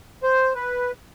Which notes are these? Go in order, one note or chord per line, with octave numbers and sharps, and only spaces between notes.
C5
B4